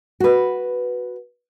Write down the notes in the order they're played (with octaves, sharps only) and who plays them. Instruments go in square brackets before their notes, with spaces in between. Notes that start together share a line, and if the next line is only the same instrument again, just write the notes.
[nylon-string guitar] F#4 B4